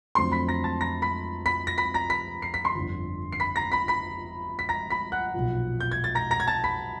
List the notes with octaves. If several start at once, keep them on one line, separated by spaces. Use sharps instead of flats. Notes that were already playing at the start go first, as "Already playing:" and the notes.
F2 D3 F#3 A3 C4 C6 C7
B5 B6
A#5 A#6
A5 A6
A#5 A#6
B5 B6
B5 B6
A#6
B5 B6
A#5 A#6
B5 B6
C7
B6
C6 C7
G1 F2 D3
C7
B5 B6
A#5 A#6
B5 B6
B5 B6
B6
A#5 A#6
B5 B6
F#5 F#6
B1 A#2 F3
G6
G#6
A6
A#5 A#6
A#5 A#6
G#6
A5 A6
B5 B6